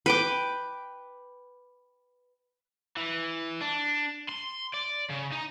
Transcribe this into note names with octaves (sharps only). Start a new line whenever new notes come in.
B4 G5 D6
E3
D4
C6
D5
C#3
D#4